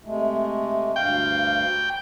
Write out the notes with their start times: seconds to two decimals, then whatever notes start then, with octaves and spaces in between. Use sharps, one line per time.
0.05 C3 G#3 A3
0.96 D2 G2 F5 G5